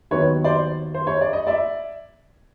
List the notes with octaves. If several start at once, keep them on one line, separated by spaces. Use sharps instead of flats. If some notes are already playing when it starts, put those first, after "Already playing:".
D#2 D#3 F#3 B3 B4 C#5
C5 D5
C5
C#5
D5
D#5
D5 E5